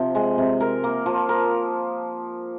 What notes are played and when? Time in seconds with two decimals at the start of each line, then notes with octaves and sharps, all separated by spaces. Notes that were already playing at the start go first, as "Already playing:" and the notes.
Already playing: C3 F3
0.15 G#3
0.38 C3
0.60 A#4
0.84 A#3
1.06 F3
1.29 A#4